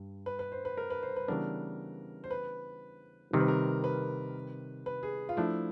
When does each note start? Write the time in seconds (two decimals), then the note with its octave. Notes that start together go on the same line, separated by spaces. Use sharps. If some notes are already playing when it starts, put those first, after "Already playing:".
Already playing: G2
0.26 B4
0.39 B4
0.52 C5
0.65 B4
0.77 A#4
0.90 B4
1.03 C5
1.16 B4
1.28 C#3 E3 G3 B3 D4 A#4
2.24 C5
2.31 B4
3.33 C3 D#3 G3 A#4
3.40 B4
3.48 A#4
3.84 B4
4.86 B4
5.03 G#4
5.29 F4
5.37 F3 A3 D4 E4